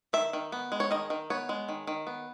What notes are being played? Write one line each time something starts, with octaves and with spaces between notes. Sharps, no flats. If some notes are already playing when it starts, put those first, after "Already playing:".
D#3 E5
D#3
B3
G#3
C#5
D#3 D#5
D#3
B3 C#5
G#3
D#3
D#3
B3